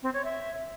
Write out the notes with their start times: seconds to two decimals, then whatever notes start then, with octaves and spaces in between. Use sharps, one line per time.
0.03 C4
0.13 C#5
0.24 E5